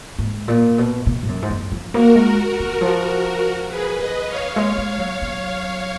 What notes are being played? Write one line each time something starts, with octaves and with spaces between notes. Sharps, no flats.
G#2
A#2
B2
B2
G#2
F#2
G#2
F#2
F3
A#3 F#4 A#4
G#3
D#3
F3
G#4 B4
B4 D#5
C#5 F5
G#3
G#3
F#3
F#3